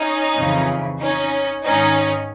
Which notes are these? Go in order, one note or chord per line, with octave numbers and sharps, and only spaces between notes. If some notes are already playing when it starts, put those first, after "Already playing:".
Already playing: C#4 D#4
F2 C#3 E3
C#4 D#4
G#2 D#3 C#4 D#4